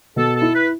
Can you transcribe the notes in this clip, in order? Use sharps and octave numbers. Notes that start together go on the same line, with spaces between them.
B2 A4
A4
E4
B4